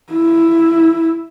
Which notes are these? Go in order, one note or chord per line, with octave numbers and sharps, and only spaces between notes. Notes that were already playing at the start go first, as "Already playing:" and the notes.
E4